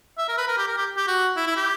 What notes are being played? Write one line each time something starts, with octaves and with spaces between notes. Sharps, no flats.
E5
A#4
B4
A#4
G4
A#4
G4
G4
F#4
E4
E4
G4